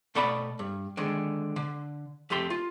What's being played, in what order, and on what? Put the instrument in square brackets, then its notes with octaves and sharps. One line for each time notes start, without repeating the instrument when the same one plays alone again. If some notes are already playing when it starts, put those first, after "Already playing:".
[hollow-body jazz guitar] B2 A3 A4 D5 F#5 B5
G2
D3 D#3 G#3
D3
F2 A3 G4 C6
F4